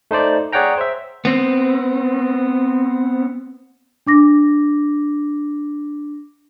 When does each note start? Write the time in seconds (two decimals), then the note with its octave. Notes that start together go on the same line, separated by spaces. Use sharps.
0.11 A3 D#4 C5 D5
0.52 G#4 C#5 D5 F#5 G5 A#5
0.78 C5 E5
1.25 B3 C4
4.07 D4 D6 A#6